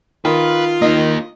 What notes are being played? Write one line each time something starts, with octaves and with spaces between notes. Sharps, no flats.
D#3 F4 B4
D#3 A#3 D#4 D#5